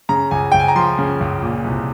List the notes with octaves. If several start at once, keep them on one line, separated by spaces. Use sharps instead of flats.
C#3 A#5
C#2 G#5
C#2 G5
G#5
A#5
F3 C6
C#3
C#2
A#2
C2